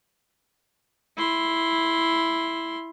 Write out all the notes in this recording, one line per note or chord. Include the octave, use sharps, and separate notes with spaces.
E4 C6